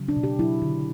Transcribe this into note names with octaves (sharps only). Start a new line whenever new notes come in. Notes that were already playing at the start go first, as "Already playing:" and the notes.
Already playing: C#3 F#3
D4
B2
G4
F#3 E4
D3